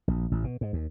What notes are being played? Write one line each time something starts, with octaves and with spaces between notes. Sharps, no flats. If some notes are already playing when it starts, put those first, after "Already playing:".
A#1
A1
B2
G#2
D#2